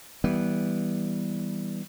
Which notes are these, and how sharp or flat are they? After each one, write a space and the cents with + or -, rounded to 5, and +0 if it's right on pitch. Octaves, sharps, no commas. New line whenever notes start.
E3 -15 G3 +0 B3 -15